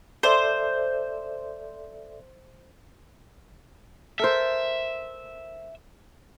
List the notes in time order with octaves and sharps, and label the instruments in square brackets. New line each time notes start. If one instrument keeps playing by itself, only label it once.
[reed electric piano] A4 D5 E5 [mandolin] C5
[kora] A4 A#4 C5 [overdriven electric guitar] E5